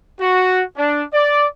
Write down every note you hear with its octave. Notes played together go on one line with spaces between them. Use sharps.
F#4
D4
D5